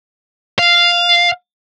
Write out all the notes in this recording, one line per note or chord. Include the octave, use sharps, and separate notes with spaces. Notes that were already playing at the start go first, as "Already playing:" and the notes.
F5